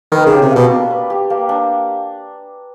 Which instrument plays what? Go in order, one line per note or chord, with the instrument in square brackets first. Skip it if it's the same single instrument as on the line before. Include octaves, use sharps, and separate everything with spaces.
[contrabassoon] D#3 [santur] B4
[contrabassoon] C#3 [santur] G4
[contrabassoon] C3
[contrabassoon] B2 [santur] A#3
[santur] D4
B4
G4
A#3
D4